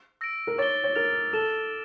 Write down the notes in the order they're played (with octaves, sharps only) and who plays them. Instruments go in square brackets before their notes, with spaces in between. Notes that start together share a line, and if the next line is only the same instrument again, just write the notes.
[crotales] E6 A#6 D7
[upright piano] A#4
[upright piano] C#5 [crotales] D6 A6 D7 G7
[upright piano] C#5
[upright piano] A#4 [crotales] F6 A6 D7 F7
[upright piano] A4 [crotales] E6 A6 E7 G7